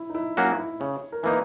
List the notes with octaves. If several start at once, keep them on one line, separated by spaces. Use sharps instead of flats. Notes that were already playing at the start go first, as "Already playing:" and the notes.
Already playing: E4
D#4
E4
F#3 A#3 C#4 E4 F#4
E4
C#3 C#5
A#4
E3 A#3 D#4 B4